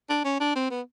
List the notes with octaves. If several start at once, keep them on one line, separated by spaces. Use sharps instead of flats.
D4
C#4
D4
C4
B3